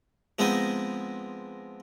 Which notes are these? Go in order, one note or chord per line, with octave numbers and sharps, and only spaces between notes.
F3 G#3 B3 C4 D#4 D#5